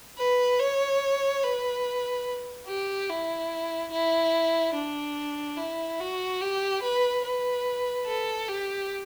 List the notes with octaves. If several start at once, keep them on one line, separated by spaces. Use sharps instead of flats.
B4
C#5
B4
G4
E4
E4
D4
E4
F#4
G4
B4
B4
A4
G4